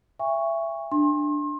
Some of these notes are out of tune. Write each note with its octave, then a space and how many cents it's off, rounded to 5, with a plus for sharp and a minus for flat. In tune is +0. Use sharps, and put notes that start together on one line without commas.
E5 +20 G#5 -45 C#6 +0
D4 +10 C6 +35